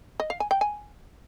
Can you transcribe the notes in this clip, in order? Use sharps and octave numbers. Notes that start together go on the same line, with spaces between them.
D#5
F5
G#5
G5
G#5